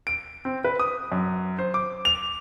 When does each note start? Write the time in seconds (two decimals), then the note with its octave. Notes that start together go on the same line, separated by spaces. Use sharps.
0.07 D7
0.45 C4
0.64 B4
0.80 D#6
1.12 F#2
1.59 C5
1.74 D6
2.05 F7